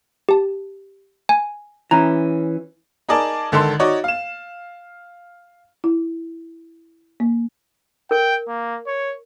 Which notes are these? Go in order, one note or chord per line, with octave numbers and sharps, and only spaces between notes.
G4 A5
G#5
E3 C#4 A#5
D#4 G#4 A#4 D5 A5
G#1 D3 D#3 A4 C6
D#4 F#4 C#5 D5
F5 E7
E4
A#3
A#4 G5
A#3
C#5